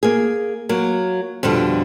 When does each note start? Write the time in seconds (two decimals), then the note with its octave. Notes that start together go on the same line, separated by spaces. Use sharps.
0.03 A#3 G#4
0.69 F#3 A#3
1.43 F2 B2 D3 G3